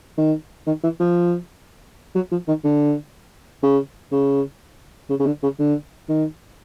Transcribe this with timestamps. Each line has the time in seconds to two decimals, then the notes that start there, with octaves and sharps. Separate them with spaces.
0.18 D#3
0.66 D#3
0.83 E3
1.00 F3
2.15 F#3
2.31 F3
2.47 D#3
2.64 D3
3.63 C#3
4.12 C#3
5.09 C#3
5.19 C#3
5.26 D3
5.43 C#3
5.59 D3
6.09 D#3